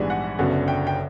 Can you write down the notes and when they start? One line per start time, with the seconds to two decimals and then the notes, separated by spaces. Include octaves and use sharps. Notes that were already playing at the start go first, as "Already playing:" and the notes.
Already playing: A#1 G#2 E3 G3 B3 G#5
0.10 F#5
0.39 F#1 F#2 D3 F#3 B3 F#5
0.68 G5
0.87 G5